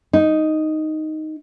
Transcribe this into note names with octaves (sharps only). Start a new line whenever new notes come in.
D#4